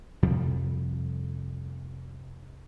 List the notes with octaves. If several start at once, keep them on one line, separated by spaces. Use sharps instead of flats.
F2 C3 F3 G3